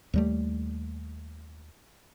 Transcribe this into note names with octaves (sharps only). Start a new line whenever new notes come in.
D#2 G3 A3